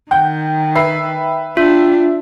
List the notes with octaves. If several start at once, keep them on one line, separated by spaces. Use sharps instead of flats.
D#3 F#5 G5 G6
B4 E5 C7
D4 F4 E5